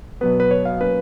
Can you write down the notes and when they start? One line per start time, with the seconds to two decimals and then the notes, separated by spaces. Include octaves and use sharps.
0.21 B2 F#3 B3 B4
0.40 B4
0.51 C#5
0.65 F5
0.81 F#3 A#3 C#4 B4